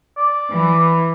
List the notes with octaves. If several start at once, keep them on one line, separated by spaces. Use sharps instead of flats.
D5
E3